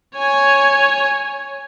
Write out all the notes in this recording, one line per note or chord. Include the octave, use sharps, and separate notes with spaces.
C#5 G#5